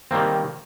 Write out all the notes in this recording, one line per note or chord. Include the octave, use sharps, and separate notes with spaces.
D#3 G3 A#3 C4